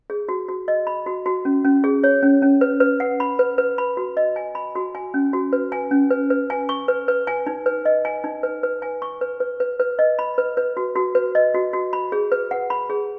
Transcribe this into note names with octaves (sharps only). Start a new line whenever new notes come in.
G#4
F#4
F#4
D#5
B5
F#4
F#4
C#4
C#4
G#4
C#5
C#4
C#4
B4
B4
F#5
B5
B4
B4
B5
F#4
D#5
G#5
B5
F#4
G#5
C#4
F#4
B4
G#5
C#4
B4
B4
G#5
C#6
B4
B4
G#5
D#4
B4
D#5
G#5
D#4
B4
B4
G#5
C#6
B4
B4
B4
B4
D#5
B5
B4
B4
F#4
F#4
B4
D#5
F#4
F#4
B5
G#4
B4
F#5
B5
G#4